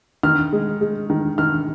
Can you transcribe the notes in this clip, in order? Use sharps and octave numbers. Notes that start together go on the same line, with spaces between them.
D#3 F6
G#3
G#3
D#3
D#3 F6